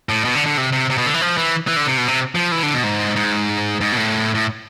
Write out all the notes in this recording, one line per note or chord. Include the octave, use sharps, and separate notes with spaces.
A2
B2
D3
D3
C3
C3
C3
B2
D3
E3
F3
E3
E3
D3
C3
B2
C3
F3
E3
D3
B2
G#2
G#2
G#2
B2
A2
A2